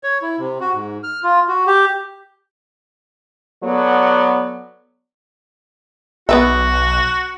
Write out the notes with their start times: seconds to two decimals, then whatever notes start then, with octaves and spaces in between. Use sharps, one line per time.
0.04 C#5
0.22 E4
0.38 C3
0.61 F#4
0.74 G#2
1.03 F6
1.23 F4
1.48 F#4
1.67 G4
3.64 F#3 B3 A4 D5
6.29 B1 B3 F#4 B4 E5